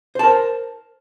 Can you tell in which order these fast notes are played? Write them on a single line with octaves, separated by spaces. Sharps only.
C5 A5 A#4